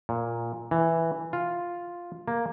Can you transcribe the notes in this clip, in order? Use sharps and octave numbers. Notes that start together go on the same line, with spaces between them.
A#2
E3
F4
A#3